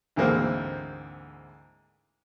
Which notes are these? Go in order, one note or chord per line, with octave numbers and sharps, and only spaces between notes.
D2 G#2 E3 A3 A#3 C4